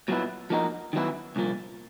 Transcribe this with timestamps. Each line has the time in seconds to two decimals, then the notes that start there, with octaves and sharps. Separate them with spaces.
0.08 A#2 F#3 B3 E4
0.50 F3 A#3 D#4 F#4 A#4
0.93 D#3 F#3 B3 E4
1.36 C2 A#2 F3 A#3